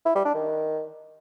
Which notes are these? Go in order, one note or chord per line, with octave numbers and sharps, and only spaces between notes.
E4
G3
D4
D#3